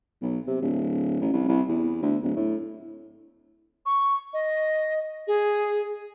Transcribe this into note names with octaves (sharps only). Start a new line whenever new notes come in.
B1
C3
D1
A1
C2
C2
E2
D2
D1
A2
C#6
D#5
G#4